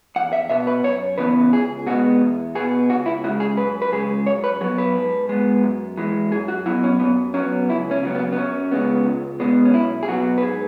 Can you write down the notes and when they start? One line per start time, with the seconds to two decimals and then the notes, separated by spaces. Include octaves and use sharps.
0.16 E2 F#5
0.33 E5
0.50 B2 B3 E5
0.67 B4
0.84 F#2 C#5
1.18 C#3 E3 B3 B4
1.53 C#2 G#4
1.87 B2 G#3 B3 F#4
2.21 E2
2.55 B2 B3 G#4
2.89 C#2 F#4
3.06 E4
3.24 C#3 G#3 F#4
3.40 G#4
3.57 F#2 B4
3.82 B4
3.92 C#3 G#3 G#4
4.26 F#2 C#5
4.44 B4
4.61 F#3 G#4
4.64 B3
4.78 B4
4.95 G#2
5.29 G#3 B3
5.64 F#2
5.98 E3 G#3
6.31 F#2 G#4
6.48 F#4
6.66 F#3 B3 E4
6.83 C#4
7.00 F#2 B3
7.34 F#3 B3 C#4
7.69 C#2 E4
7.91 C#4
8.03 C#3 F#3 B3
8.15 B3
8.32 B3
8.37 F#2 C#4
8.71 C#3 G#3 B3
9.06 C#2
9.40 B2 G#3 B3
9.65 C#4
9.74 B1 E4
10.03 G#4
10.08 B2 F#3 B3 F#4
10.38 B4
10.43 G#2 G#4